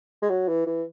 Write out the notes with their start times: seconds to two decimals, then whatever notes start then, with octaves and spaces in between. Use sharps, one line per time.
0.22 G#3
0.29 F#3
0.48 E3
0.67 E3